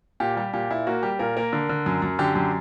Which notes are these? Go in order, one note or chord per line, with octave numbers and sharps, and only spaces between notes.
A#2 G4
G3 G4
A#2 G4
A#2 E4
A#3 F#4
G3 G4
A#2 A#4
A#3 A#4
D3
D3
F#2
F#2
D3 G4
F#2 G4